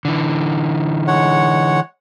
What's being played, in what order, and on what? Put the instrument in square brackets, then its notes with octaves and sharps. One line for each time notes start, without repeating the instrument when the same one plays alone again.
[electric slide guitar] D3 E3
[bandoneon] G#3 C#5 F#5